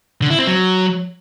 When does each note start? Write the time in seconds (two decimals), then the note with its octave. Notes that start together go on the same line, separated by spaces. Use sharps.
0.22 D3
0.30 E4
0.39 C4
0.47 F#3